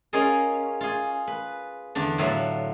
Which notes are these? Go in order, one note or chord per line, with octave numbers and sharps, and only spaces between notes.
C#4 F4 G#4 A#4 D#5
F4 G#4
B4
E2 D3 D4
A2 F#3 F4 B5